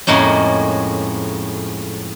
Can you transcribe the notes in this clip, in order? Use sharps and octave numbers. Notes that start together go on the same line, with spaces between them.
F2 A2 G#3 A#3 C#4